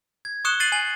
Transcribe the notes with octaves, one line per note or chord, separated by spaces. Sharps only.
G#6
C#6 D#6 F#6 C#7 E7 G7
A6 C7 D#7 F#7
G#5 F#7